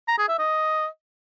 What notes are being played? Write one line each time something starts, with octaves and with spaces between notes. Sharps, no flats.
A#5
G#4
E5
D#5